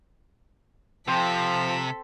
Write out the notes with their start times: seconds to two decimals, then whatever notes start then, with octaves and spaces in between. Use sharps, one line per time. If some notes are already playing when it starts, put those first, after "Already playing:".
1.08 C3 F3 C4 A4 B6